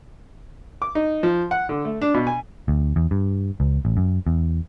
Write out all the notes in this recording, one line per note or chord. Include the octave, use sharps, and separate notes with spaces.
D6
D#4
F3
F#5
D3
A3
D4
B2
G#5
D2
E2
G2
C#2
A1
F#2
E2